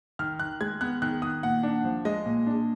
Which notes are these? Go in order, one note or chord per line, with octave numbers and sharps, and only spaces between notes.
D#3 F6
D#3 F#6
G#3 G#6
B3 F#6
D#3 F#6
D#3 D#6
A#2 F#5
D4
F3
G#3 D#5
A#2
D4